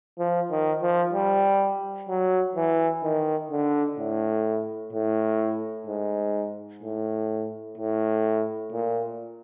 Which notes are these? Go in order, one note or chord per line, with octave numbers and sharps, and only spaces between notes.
F3
D#3
F3
G3
F#3
E3
D#3
D3
A2
A2
G#2
A2
A2
A#2